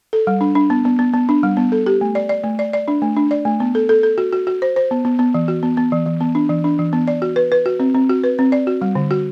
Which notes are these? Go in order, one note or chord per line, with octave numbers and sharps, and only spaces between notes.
A4
G3
D4
D4
B3
B3
B3
B3
D4
G3
B3
A4
G4
A3
D5
D5
A3
D5
D5
D4
A3
D4
D5
A3
B3
A4
A4
A4
F#4
F#4
F#4
C5
C5
B3
B3
B3
E3
F#4
B3
B3
E3
E3
B3
D4
E3
D4
E3
B3
D5
F#4
B4
B4
F#4
C4
C4
F#4
B4
C4
D5
F#4
G3
D3
F#4